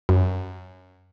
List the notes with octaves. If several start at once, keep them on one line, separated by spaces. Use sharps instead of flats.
F#2